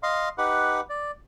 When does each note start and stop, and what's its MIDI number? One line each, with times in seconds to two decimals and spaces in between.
0.03 0.29 75
0.03 0.29 77
0.03 0.29 84
0.38 0.81 63
0.38 0.81 67
0.38 0.81 71
0.38 0.81 78
0.90 1.11 74